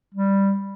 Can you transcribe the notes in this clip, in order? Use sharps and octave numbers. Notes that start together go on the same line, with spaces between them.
G3